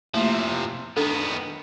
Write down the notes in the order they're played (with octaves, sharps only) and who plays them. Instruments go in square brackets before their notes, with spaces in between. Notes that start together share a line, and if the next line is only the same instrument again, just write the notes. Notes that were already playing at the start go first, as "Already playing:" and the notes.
[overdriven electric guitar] C3 F3 [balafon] A3 A#3 E4
[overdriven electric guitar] D#3 B3 [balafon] D4 A4